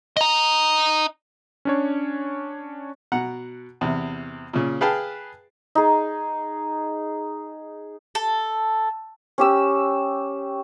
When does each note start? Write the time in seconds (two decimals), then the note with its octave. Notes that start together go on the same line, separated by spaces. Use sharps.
0.17 D#5 A#5
1.65 C#4 D4 C#5
3.12 B2 F#5 A#5
3.81 E2 C3
4.53 A#2 C#3
4.81 G#4 B4 F5 G5 A5
5.75 D#4 G#4
8.15 A4
9.38 C#4 G4 E6